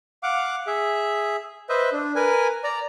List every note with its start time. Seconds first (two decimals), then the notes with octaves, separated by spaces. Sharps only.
0.23 F5 F#5 D6
0.67 G#4 E5
1.69 B4 C5 D#5 E5
1.92 D4
2.15 A#4 B4 G#5
2.64 D5 A#5